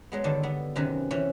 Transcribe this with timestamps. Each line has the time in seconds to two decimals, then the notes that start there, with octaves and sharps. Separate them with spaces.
0.12 F#3 G#3 B3
0.24 G2 D3 D#3 D5 A5
0.43 D3 B3
0.75 F#2 C3 D#3 B4 G#5
1.11 C3 E3 C#4